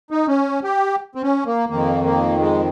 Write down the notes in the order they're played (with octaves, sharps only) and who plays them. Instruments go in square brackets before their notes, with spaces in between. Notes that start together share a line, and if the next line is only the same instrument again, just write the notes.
[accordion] D#4
C#4
G4
C4
C#4
A#3
F2 D#3 A#3
A#3
G#3